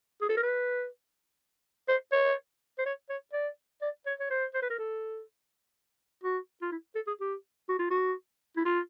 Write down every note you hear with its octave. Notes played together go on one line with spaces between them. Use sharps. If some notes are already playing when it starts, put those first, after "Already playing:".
G#4
A4
A#4
B4
C5
C#5
C5
C#5
C#5
D5
D5
C#5
C#5
C5
C5
B4
A#4
A4
F#4
F4
E4
A4
G#4
G4
F#4
F4
F#4
E4
F4